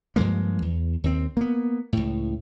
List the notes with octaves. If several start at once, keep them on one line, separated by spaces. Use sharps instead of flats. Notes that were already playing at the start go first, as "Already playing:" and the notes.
G2 F3 G#3 A#3
E2
D#2 C4
A#3 B3
C#2 A2